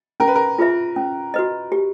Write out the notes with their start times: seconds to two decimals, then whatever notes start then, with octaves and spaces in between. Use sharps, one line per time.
0.20 C#4 A#4
0.28 B4
0.35 A#4
0.58 F4 G#4 B4 E5
0.96 C#4
1.34 F#4 B4 D#5
1.72 G4